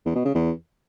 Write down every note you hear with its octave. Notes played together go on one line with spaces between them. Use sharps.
E2
B2
C#3
E2